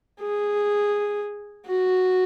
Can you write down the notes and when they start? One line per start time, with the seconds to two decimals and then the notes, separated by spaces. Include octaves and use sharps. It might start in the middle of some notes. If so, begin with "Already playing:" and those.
0.20 G#4
1.66 F#4